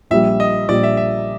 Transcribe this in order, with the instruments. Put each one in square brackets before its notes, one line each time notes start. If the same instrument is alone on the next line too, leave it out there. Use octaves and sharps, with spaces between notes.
[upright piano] A#1 A#2 G3 [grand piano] E5
[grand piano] D#5
[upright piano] A#1 A#2 G3 [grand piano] D5
[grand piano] E5
E5